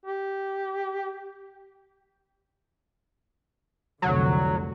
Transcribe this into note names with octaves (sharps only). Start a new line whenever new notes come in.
G4
F1 C2 D3 F#3